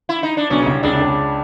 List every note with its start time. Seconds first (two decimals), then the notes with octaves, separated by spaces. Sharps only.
0.09 E4
0.23 D#4
0.37 D4
0.50 B1 B2 C#4
0.62 C#3
0.66 C2 C3
0.83 C#2 C#3 D4
0.95 C3
1.00 C#2 C#3